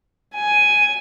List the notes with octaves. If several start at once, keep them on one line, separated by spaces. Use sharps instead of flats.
G#5